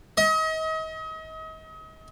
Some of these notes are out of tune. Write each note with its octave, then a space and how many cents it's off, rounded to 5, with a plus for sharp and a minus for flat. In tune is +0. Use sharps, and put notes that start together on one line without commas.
D#5 +35